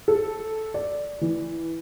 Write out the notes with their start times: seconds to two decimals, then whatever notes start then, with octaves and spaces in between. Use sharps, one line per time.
0.08 A4
0.74 D5
1.21 E3